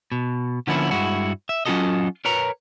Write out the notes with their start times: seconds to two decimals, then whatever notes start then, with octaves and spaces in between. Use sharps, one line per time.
0.12 B2
0.67 D3 F3 A#3 B3 C#4 E4
0.91 G2 G#3 E4 F#4
1.49 E5
1.66 F#3 C#4 F4 F#4 A4 D#5
2.25 A#4 B4 C#5 A#5